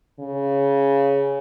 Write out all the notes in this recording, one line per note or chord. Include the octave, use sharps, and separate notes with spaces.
C#3